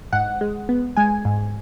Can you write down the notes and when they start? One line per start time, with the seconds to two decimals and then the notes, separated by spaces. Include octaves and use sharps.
0.13 G#2 F#5
0.41 G#3
0.69 B3
0.97 G#3 G#5
1.25 G#2